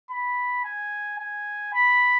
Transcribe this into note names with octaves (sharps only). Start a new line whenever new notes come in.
B5
G#5
G#5
B5